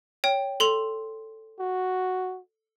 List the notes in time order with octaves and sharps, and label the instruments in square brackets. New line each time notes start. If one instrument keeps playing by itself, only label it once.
[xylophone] C#5 G5
A4 C6 F7
[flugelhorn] F#4